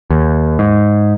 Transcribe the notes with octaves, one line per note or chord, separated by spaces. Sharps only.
D#2
G#2